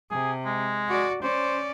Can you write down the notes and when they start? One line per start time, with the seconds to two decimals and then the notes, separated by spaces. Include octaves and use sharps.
0.11 C3 G#4
0.45 G#3
0.89 F#4 D5
1.22 C#4 C5 D5